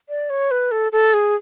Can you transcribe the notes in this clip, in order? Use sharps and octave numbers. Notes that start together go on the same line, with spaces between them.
D5
C#5
B4
A4
A4
G#4